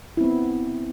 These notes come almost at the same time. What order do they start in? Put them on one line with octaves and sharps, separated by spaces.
E4 C4 B3